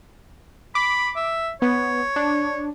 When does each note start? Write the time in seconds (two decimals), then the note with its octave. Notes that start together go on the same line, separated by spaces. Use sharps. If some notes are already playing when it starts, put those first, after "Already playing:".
0.75 B5 D6
1.16 E5
1.62 B3 C#5
2.16 D4